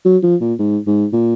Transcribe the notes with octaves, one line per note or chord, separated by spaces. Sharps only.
F#3
F3
A#2
G#2
G#2
A#2